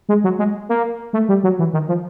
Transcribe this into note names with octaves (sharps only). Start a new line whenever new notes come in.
G#3
F#3
G#3
A#3
A3
G3
F#3
E3
D#3
F3